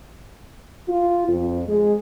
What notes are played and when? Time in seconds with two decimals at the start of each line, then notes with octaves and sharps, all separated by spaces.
0.88 F4
1.28 F2
1.68 G#3